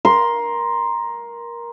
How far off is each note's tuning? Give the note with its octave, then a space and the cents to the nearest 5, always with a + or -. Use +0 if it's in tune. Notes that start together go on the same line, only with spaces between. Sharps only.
A#4 +15 C6 +0